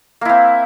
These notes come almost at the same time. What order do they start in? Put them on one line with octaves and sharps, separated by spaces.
A#3 E4 C4